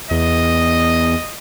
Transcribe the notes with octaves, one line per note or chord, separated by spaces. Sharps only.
E2 D#5